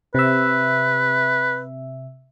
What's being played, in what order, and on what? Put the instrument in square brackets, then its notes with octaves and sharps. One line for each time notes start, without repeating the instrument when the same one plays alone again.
[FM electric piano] C3 E5 [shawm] B4